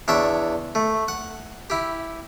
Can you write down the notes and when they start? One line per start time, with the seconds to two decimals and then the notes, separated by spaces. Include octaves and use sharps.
0.08 E2 D4 C#5 E5 A5
0.75 A3
1.08 F#5
1.70 E4 G4